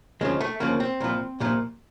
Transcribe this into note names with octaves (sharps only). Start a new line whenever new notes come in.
D2 C#3 F3 G#3
A3
D2 C#3 F3 A#3
C4
C2 A#2 F3
C2 A#2 F3